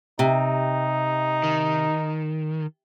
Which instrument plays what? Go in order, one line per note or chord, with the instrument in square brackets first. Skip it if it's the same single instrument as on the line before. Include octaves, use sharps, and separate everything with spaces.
[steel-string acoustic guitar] C3 [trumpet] D#4
[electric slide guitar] D#3